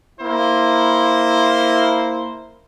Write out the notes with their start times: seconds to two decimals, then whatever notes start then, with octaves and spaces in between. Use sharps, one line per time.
0.20 A#3 E4 C5